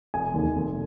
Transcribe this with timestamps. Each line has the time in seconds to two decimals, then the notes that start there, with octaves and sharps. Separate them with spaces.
0.14 F1 G#5
0.34 D#2 D#3 G#3
0.55 F1